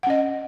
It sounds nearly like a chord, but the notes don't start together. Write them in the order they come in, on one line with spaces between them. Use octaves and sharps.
F#5 C#4 D#5